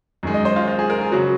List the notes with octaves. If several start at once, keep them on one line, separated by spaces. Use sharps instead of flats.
F#2 D#3 G#3
D#5
C5
F4
F4
G#4
A#4
G#4
C#3 F#3 F#4